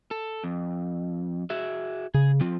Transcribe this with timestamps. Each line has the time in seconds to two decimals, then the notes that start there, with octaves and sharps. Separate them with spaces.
0.11 A4
0.44 F2
1.50 F#4 G#4 E5
2.14 C#3 G#4
2.40 F3 C4 F4